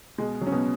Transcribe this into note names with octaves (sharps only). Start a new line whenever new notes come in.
B2 G#3
F#3
C#4
B2 B3